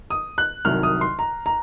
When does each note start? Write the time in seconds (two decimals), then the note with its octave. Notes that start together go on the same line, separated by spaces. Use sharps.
0.10 D#6
0.38 F#6
0.65 C2 C3 D#3 F#3 F6
0.83 D#6
1.01 C6
1.19 A#5
1.46 A#5